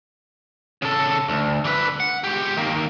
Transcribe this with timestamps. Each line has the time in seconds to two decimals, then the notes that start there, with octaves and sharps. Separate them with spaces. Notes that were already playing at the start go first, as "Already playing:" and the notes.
0.82 C#3 A4
1.29 D2
1.65 D3 B4
2.00 F#5
2.24 G#3 G4
2.57 D#3 A#3